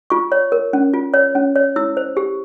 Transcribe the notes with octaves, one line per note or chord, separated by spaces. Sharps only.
F4 C#6
C#5
A#4
C#4
F4
C#5
C#4
C#5
E4 E6
C5
G4